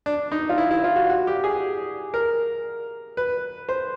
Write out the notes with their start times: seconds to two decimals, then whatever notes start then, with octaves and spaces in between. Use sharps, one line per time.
0.06 D4
0.32 D#4
0.49 F4
0.58 E4
0.71 E4
0.84 F4
0.96 F#4
1.10 F#4
1.27 G4
1.44 G#4
2.14 A#4
3.17 B4
3.69 C5